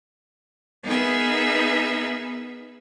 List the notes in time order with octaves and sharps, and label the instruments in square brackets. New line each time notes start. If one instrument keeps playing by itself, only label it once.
[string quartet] B3 D#4 G#4 A#4 B4 E5